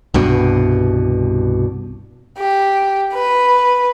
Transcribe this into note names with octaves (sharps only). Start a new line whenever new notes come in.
C2 G2 B2
G4
B4